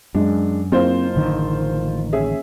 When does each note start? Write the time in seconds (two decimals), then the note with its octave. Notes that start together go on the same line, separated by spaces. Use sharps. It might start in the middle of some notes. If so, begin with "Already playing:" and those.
0.15 F#2 G#3 D4
0.72 F#1 C4 F4 C5
1.16 A1 D3 D#3
2.12 C#4 G#4 E5